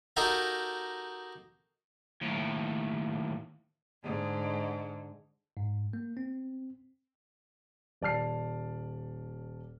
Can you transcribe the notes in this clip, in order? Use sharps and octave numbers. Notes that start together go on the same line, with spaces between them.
D#4 F#4 G4 A4 A#4 F5
D#2 A2
G#2 D3
G#2
A#3
C4
D#1 D5 A5 F6 C7